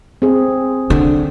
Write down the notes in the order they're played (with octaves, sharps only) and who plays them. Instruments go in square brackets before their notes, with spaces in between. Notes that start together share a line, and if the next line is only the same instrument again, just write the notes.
[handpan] C4 G#4
[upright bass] D3